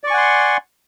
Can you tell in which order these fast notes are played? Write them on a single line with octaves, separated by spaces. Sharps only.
D5 C#6 G#5 F#5 C6